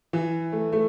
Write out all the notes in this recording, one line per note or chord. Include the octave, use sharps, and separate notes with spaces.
E3
A3
A3